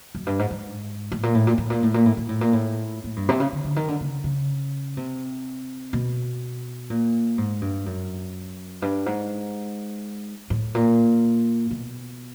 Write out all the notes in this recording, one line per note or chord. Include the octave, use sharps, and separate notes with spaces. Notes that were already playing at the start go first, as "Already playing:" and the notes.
F#2
G2
G#2
G#2
A2
A#2
A2
A#2
A2
A#2
A2
A#2
A2
A#2
A2
A#2
A2
A2
G2
C3
C#3
D3
D3
D#3
D3
C#3
C#3
C3
B2
A#2
G#2
G2
F#2
G2
G#2
A2
A#2
B2